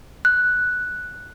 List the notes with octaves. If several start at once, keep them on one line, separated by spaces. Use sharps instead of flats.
F#6